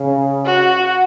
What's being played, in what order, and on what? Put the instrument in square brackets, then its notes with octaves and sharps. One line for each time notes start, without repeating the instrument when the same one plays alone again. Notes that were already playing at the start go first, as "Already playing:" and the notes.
Already playing: [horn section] C#3
[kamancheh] F#4